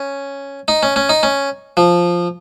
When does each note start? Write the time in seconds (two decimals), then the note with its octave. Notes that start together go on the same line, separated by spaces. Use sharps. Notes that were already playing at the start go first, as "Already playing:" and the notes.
Already playing: C#4
0.68 D#4
0.83 C#4
0.96 C#4
1.09 D#4
1.23 C#4
1.77 F3